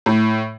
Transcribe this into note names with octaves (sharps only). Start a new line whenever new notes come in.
A2